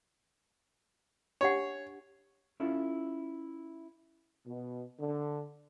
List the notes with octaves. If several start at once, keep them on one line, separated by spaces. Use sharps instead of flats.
D4 G4 C#5 F#5
C#4 E4 F4 A4
B2
D3